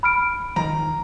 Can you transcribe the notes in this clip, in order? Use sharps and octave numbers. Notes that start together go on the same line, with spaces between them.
B5 F6 D7
E1 D#3 F3 A#5